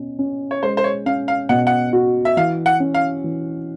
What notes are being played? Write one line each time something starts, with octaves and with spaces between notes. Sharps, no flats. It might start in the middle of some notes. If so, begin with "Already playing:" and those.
Already playing: B2 C#4
C#4
C#5
G#3 C5
C5
C#5
C#4 F5
F5
B2 F#5
F#5
F#4
E5
E3 F5
F#5
C#4
F5
E3